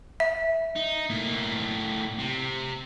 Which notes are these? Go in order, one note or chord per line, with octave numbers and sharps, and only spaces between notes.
E5
D#4
A2 A#3
C3